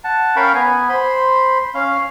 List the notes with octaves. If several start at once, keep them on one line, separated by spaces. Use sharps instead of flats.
F#5 A5
C#4 A#4 F5 G5 B5 C#6
B3 G#5
C5 B5 C6
C#4 F5